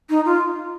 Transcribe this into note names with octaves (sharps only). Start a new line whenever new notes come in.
D#4
F4